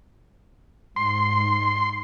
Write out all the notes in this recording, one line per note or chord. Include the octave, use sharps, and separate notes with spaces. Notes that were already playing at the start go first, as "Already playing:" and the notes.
G#2 C6